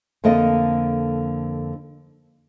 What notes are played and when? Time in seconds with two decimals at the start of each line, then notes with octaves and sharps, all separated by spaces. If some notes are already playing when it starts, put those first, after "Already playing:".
0.24 F2 D3 A#3 A4 D#5